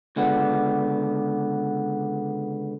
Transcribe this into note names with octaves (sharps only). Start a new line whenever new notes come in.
C#2 D3 B3